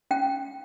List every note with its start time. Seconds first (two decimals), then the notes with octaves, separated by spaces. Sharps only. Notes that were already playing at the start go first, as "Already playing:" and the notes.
0.11 C#4 G5